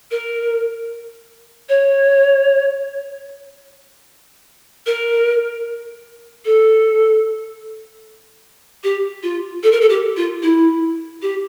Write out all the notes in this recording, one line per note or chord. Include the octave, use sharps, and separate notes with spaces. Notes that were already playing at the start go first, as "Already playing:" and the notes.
A#4
C#5
A#4
A4
G4
F4
A4
A#4
A4
G4
F4
E4
G4